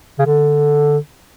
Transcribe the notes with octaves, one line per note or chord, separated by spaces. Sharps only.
C#3
D3